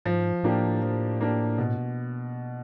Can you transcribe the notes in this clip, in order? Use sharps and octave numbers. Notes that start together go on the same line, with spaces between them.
G#2 F3
A2 A#3 D4 G4
F3
A#3 D4 G4
B2